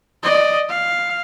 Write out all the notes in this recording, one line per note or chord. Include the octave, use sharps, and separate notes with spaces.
D5 D#5
F5